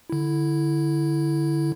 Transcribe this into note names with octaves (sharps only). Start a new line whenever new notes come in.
D3 E4